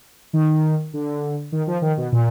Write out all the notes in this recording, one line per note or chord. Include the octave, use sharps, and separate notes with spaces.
D#3
D3
D#3
F3
D#3
B2
A#2